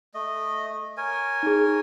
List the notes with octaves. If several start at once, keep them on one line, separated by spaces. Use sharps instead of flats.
A3 D#5
A#4 C#5 G#5
D#4 G#4